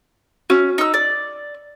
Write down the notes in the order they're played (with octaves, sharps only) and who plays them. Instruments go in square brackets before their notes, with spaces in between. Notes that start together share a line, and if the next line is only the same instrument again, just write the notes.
[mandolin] C#4 [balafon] F#4
[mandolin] D#4 E6
D5